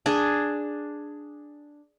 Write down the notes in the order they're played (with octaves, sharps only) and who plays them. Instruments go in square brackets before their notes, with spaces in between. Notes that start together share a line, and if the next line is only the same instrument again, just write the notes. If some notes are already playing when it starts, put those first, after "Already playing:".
[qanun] D4 G#4